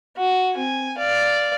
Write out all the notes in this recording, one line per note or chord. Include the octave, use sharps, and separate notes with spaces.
F#4
C4 G#5
D5 F5